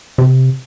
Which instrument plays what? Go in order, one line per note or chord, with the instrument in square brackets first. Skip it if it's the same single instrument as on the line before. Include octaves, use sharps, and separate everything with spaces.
[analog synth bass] C3